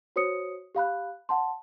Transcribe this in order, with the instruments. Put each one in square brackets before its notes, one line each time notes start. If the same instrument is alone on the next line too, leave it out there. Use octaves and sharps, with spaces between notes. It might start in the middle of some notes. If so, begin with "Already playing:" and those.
[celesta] F#4 C5 C#5 D#6 C#7
G4 F5 B5 F#6
F#5 A5 C6